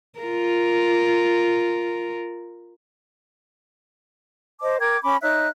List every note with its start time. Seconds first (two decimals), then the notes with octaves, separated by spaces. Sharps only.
0.20 F4 A#4
4.61 C5 D#5 A5 D6
4.80 A#4 G5 D6 G#6
5.02 C#4 B5 D6
5.22 D#4 C#5 E5 F#6